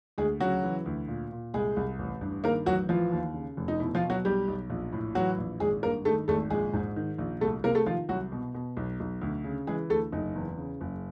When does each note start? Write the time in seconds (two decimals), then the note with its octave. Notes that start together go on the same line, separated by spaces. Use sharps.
0.18 D2 G#3 G#4
0.40 C#3 F#3 F#4
0.63 E3
0.86 D2
1.08 A#2
1.32 A#2
1.54 C2 G#3 G#4
1.77 C2
1.99 A1
2.21 G2
2.44 D#3 A#3 A#4
2.66 A1 F#3 F#4
2.89 E3 F3 F4
3.12 D#2
3.34 C#3
3.57 F1
3.68 D#4
3.80 B2 E4
3.95 F3 F4
4.02 B2
4.10 F#3 F#4
4.25 B1 G3 G4
4.48 B1
4.70 A#1
4.93 A2
5.15 E3 F#3 F#4
5.38 A#1
5.60 G#1 G#3 G#4
5.83 G2 A#3 A#4
6.05 D#3 A3 A4
6.28 G#1 A3 A4
6.50 A#1 G#3 G#4
6.73 G#2
6.96 D#3
7.18 A#1
7.41 C2 A3 A4
7.64 C3 A#3 A#4
7.75 A3 A4
7.86 D#3 F3 F4
8.09 C2 F#3 F#4
8.32 B2
8.55 B2
8.77 B1
9.00 B1
9.21 D2
9.44 C#3
9.67 E3 G#3 G#4
9.90 D2 A3 A4
10.12 F#1 D#4
10.35 E2
10.58 C#3
10.81 F#1